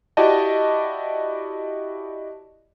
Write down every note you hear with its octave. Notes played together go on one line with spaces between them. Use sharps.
E4 F#4 G4 D5 D#5 A5